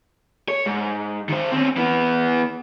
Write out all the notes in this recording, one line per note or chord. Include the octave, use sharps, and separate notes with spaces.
C#5
G#2
D#3 C5
C4 C#4
E3 B3